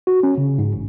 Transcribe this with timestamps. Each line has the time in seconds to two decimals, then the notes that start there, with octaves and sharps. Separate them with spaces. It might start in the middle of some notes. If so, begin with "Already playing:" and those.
0.07 F#4
0.23 C#4
0.38 C#3
0.59 G#2
0.74 A1